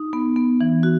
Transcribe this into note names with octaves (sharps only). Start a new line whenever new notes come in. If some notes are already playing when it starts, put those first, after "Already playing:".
Already playing: D#4
B3
B3
E3
F#4